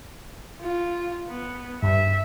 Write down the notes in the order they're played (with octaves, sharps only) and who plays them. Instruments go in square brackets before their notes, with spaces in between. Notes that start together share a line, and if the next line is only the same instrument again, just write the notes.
[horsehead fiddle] F4
B3
[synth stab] G2 [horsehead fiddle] E5